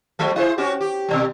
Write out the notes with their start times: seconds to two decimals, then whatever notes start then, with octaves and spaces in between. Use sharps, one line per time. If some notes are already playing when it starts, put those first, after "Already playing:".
0.19 F3 F#3 A3
0.36 E4 G#4 C5
0.58 C#4 F#4 G4
0.81 G4
1.09 B2 E3 G3